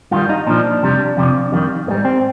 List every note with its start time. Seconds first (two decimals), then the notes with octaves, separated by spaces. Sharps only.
0.11 G2 D#3 G3 F4
0.30 D#4
0.47 A#2 F3 D4
0.83 F2 C3 G3
1.17 F2 C3 F3
1.52 F2 D#3 G3
1.87 G#2 A#3
1.91 G3
2.05 C4